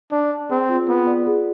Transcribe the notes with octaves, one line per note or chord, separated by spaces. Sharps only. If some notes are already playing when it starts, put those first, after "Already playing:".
D4 D5
D5
C4 G#4
F4
B3 F4
D5
G#4